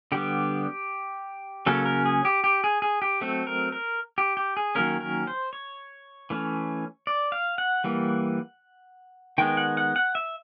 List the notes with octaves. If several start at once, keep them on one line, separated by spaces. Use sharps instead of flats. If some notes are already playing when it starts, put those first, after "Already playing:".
D3 G3 B3 G4
C#3 F#3 A#3 C#4 A4
A#4
G#4
G4
G4
G#4
G#4
G4
F#3 A3 C4 A4
A#4
A#4
G4
G4
G#4
D#3 F#3 A#3 C#4 A#4
A#4
C5
C#5
E3 A3 C#4
D5
F5
F#5
E3 G3 A#3
D#3 G#3 B3 G5
F#5
F#5
F#5
E5